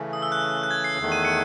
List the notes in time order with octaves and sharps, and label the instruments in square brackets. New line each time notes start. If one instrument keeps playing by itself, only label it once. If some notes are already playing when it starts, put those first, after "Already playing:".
Already playing: [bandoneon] C#3 E3 A3 C#4
[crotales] D#6
E6
F#6
F#6
G#6
C7
[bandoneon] E2 D#3 A3
[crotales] D#7
C#7